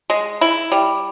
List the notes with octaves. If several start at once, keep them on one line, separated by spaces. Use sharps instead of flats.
G#3
E4
G3